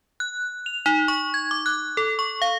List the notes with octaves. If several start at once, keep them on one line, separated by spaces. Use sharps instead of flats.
F#6
F7
D#4
C#6
G#6
D6
F#6
A4
C#6
F5